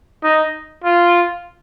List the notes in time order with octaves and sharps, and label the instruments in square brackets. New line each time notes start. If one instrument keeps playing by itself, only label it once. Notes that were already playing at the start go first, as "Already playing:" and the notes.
[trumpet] D#4
F4